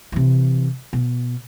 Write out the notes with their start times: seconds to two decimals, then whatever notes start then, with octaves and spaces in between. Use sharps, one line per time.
0.12 C3 E3
0.93 B2